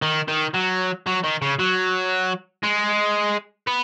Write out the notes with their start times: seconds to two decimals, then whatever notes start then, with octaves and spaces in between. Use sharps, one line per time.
0.02 D#3
0.28 D#3
0.55 F#3
1.07 F#3
1.24 D#3
1.42 C#3
1.59 F#3
2.63 G#3
3.67 B3